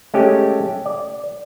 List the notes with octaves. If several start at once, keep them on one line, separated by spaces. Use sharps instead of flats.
G#3 A3 C#4 G4
D5